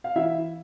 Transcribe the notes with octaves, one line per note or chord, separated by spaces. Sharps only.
F5
E3 E4 E5